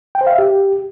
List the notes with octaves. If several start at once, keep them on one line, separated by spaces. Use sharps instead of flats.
G5
C5
F5
E5
G4